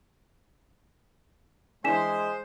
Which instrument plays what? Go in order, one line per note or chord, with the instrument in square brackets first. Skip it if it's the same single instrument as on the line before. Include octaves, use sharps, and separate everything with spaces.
[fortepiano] E3 D4 E4 [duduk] G#3 [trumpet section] C5 [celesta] G#5 B6 E7